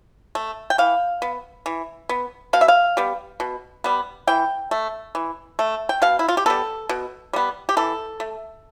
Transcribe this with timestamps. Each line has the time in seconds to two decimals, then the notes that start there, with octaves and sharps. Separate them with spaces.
0.35 A3
0.70 G5
0.78 E3 F5
1.22 B3
1.66 E3
2.09 B3
2.53 B2 F5
2.61 E5
2.68 F5
2.97 G3 B3
3.40 B2
3.84 G3 B3
4.27 E3 G5
4.71 A3
5.15 E3
5.59 A3
5.89 G5
6.02 B2 F5
6.19 E4
6.28 F4
6.37 G4
6.46 G3 B3 A4
6.89 B2
7.33 G3 B3
7.69 G4
7.77 E3 A4
8.20 A3